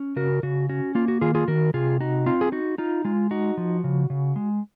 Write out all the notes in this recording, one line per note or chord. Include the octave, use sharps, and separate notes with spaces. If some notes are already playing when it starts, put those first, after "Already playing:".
Already playing: C#4
C#3 F#4 A#4
C#3 F#4
C#4 F#4
A#3 F4
F#4
D#3 F4 G#4
F4 G#4
D#3 F#4 A#4
C3 F4 G#4
D#4 F#4
C4 F4
G#4
D#4 F#4
D#4 F4
G#3 F4
D#4 F#4
F3
C#3
C#3
G#3